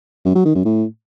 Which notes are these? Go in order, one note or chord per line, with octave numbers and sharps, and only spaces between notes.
F#2
F#3
D#3
F#2
A2